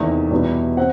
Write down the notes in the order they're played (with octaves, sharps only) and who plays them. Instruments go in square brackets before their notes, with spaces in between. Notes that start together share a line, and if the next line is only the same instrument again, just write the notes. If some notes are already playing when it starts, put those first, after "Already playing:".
Already playing: [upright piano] E2 C3 D#3 A3 E5
E2 B2 G3 B3
C4 F#5